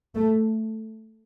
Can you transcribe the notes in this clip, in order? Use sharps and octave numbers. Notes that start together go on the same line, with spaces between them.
A3